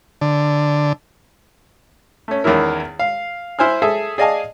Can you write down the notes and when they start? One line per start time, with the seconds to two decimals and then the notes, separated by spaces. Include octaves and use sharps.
0.21 D3
2.28 A3 C#4
2.44 E2 D#3 C#4 E4 A#4
2.99 F5
3.59 E4 C5 G#5 F6
3.82 G#4 A4 E5
4.18 G#4 D5 D#5 F5 G#5 A5